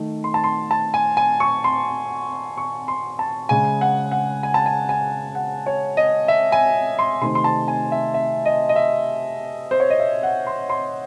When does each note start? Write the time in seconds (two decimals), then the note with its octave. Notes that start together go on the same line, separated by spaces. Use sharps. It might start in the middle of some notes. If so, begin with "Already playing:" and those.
Already playing: D#3 A3
0.24 C6
0.34 A5
0.44 C6
0.71 A5
0.94 G#5
1.17 G#5
1.40 C#6
1.64 C6
2.58 C#6
2.88 C6
3.19 A5
3.49 C#3 G#3 G#5
3.81 F#5
4.11 F#5
4.43 G#5
4.54 A5
4.66 G#5
4.89 G#5
5.35 F#5
5.66 C#5
5.97 D#5
6.28 E5
6.52 G#5
6.99 C6
7.21 C3 D#3 A3 C6
7.35 C6
7.44 A5
7.68 G#5
7.92 E5
8.14 E5
8.45 D#5
8.69 D#5
8.76 E5
9.71 C5
9.80 C#5
9.90 D#5
10.00 E5
10.23 F#5
10.47 C6
10.70 C6